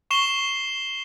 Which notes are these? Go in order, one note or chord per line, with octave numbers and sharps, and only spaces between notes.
C#6 C7 E7 G7